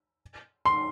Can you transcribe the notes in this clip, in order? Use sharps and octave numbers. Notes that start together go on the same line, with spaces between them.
C6